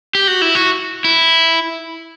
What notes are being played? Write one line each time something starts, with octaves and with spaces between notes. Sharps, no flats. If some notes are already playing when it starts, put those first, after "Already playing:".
G4
F#4
E4
F#4
E4